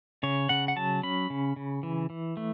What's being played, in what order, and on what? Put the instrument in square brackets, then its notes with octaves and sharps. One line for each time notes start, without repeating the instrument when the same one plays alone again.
[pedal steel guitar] C#3 C#5
C#3 F#5
F#5
F#3 A5
C#4 B5
C#3
C#3
E3
E3
A3